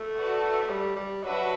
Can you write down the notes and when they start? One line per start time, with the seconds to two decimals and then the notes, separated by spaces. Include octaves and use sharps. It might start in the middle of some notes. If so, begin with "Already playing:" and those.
Already playing: A3
0.16 F#4 B4 D5 A5
0.70 G3
0.96 G3
1.23 F#3 D4 F#4 B4 E5